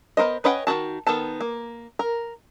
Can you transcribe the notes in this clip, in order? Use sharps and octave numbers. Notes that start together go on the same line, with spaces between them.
B3 A#4 C5 D#5
C#4 B4 D#5 F#5 G5
D#3 F3 F#4 A5
D#3 B3 A4 A5
A#3
A#4